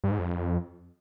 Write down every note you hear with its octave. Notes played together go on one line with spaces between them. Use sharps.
G2
G#2
F2